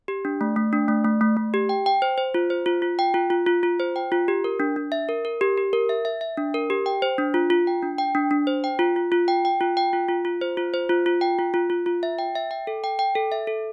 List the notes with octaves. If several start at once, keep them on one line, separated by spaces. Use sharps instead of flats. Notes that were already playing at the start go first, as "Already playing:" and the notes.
G4
D4
A3
A3
D4
A3
A3
A3
A3
G4
G5
G5
C5
C5
F4
C5
F4
F4
G5
F4
F4
F4
F4
C5
G5
F4
G4
A#4
D4
D4
E5
A#4
A#4
G4
G4
A#4
E5
E5
E5
D4
A#4
G4
G5
C5
D4
F4
F4
G5
D4
G5
D4
D4
C5
G5
F4
F4
F4
G5
G5
F4
G5
F4
F4
F4
C5
F4
C5
F4
F4
G5
F4
F4
F4
F4
E5
G5
E5
G5
A4
G5
G5
A4
E5
A4